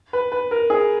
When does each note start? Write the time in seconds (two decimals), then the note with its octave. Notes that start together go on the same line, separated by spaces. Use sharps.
0.13 B4
0.32 B4
0.51 A#4
0.70 G#4